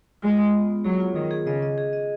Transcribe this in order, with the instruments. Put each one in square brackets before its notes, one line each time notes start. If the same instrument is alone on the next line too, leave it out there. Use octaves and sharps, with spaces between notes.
[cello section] G#3 [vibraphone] F4
[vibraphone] G#4
B3
B3
[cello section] F#3 [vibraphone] G#4
[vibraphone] F4
[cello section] D#3 [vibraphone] G#4
[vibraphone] G#4
[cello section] C#3 [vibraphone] D#5
[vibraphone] D#5
G#4
D#5